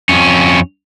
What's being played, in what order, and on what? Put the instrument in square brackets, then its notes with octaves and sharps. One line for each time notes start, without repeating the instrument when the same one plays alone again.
[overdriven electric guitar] F2 C#4